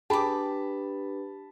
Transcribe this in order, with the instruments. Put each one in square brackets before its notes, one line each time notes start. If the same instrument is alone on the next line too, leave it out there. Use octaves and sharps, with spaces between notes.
[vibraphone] D4 G4 B4 [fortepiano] G#4 [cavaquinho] G5 D6 [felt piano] A5 B5